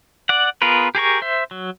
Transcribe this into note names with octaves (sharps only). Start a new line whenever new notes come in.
D5 F#5
B3 F4 G#4 A#4 B4
G4 G#4 A#4 C#6
C5 E5
F#3